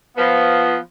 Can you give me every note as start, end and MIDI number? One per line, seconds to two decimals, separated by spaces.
0.17 0.76 53
0.17 0.76 59